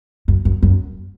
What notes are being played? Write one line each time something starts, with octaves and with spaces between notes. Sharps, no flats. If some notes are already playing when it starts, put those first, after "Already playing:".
F#2
F#2
F#2